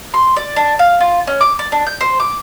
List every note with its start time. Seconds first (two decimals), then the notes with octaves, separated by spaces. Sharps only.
0.14 C6
0.36 D5
0.56 D4
0.79 F5
1.01 F4
1.27 C#4
1.41 D6
1.59 D5
1.72 D4
1.87 G6
2.01 C5
2.20 D6